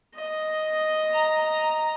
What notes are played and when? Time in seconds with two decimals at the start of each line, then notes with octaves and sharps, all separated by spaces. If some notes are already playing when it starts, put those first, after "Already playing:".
0.15 D#5
1.13 A#5